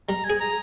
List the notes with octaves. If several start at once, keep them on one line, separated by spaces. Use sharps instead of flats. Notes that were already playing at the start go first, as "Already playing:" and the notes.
G3 A#5
G#5
G#4
A#5